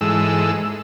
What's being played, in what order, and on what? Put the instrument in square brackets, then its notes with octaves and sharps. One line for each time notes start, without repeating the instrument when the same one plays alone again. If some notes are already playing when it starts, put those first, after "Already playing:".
[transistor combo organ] G#2 E3 G#3 A4 E6